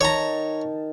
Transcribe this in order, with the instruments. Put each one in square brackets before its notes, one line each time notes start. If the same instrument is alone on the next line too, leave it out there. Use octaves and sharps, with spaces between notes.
[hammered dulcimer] D#3 A5 [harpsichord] C#5 A#5